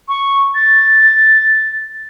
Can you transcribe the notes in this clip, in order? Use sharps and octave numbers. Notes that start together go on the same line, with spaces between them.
C#6
A6